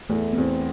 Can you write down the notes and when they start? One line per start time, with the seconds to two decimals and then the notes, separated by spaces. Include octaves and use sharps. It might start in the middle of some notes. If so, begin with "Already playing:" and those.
0.10 E2 A3
0.33 B3
0.38 E2 C4